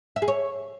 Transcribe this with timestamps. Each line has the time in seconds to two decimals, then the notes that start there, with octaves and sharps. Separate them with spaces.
0.16 E5
0.22 G#4
0.28 C#5